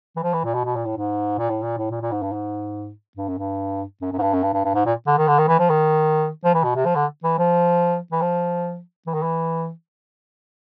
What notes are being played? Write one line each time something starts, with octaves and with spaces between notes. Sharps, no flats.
E3
F3
E3
A#2
B2
B2
A#2
A2
G#2
A#2
A2
A#2
A2
A#2
A#2
G#2
G2
G#2
G2
F#2
G2
F#2
F#2
G#2
G2
F#2
G2
G2
G2
G#2
A#2
D3
D#3
D3
D#3
E3
F3
D#3
F3
E3
B2
C3
F3
D3
E3
F3
E3
F3
E3
D#3
E3